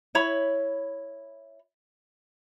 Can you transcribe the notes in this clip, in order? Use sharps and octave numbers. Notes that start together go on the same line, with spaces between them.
E4 C#5 B5